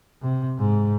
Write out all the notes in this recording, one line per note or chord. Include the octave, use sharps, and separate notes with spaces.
C3
G#2